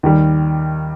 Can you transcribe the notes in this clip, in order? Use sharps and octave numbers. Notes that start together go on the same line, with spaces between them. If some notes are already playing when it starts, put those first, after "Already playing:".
D#2 D#3 G3